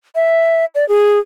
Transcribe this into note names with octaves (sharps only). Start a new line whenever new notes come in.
E5
D5
G#4